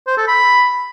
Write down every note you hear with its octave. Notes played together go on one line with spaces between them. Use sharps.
C5
A4
B5